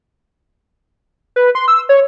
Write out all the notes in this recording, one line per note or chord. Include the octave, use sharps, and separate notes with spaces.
B4
C6
E6
C#5